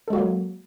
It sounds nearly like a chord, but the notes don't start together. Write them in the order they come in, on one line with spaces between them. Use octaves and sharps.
A4 G#3 F#4 A#3 F#3